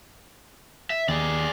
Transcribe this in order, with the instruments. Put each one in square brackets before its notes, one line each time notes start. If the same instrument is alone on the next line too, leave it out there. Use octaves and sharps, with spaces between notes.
[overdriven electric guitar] E5
[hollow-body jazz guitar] D#2 [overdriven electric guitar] G#4 D5